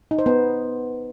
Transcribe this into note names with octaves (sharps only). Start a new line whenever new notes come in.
D#4
C5
B3